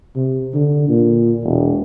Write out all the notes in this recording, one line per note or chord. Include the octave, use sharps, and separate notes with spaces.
C3
D3
A#2
E1